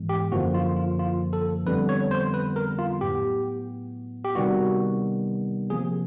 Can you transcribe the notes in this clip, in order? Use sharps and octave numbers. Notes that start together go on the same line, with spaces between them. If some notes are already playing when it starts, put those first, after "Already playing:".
Already playing: G#2 E3 G#3 B3
G4
F#2 D3 F3 A#3 F#4
F4
F4
F4
A4
F2 D3 G3 B3 B4
C#5
C5
B4
A#4
F4
A2 F#3 B3 G4
G4
C3 D#3 G3 B3 F#4
C3 F3 A#3 G#4